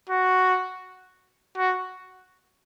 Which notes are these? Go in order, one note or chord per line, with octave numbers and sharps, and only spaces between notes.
F#4
F#4